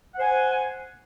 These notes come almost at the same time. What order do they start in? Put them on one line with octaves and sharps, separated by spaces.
F#5 C5 G#5